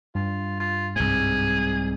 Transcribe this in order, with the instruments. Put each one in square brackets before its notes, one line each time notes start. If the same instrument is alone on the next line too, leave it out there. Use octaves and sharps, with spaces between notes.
[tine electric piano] G2 [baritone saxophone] F4
[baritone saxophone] F4
[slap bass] C2 G#2 [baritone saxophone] G#4